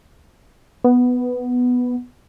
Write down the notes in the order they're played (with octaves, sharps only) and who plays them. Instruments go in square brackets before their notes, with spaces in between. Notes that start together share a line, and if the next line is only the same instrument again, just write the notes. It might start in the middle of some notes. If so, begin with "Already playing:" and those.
[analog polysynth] B3